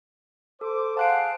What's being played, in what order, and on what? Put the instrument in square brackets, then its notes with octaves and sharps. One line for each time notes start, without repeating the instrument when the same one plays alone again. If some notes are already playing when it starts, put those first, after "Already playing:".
[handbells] A4 [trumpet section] C5 D6
[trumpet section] G#4 C5 F#5 [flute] F5 [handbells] A5 F#6 D7